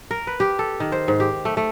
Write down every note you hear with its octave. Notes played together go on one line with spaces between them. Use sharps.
A#4
B4
G4
A4
D#3
C5
G#2
G4
A3
A3